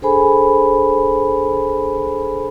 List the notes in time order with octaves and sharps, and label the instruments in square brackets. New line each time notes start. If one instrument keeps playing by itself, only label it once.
[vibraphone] D4 G#4 A4 C5 G#5 B5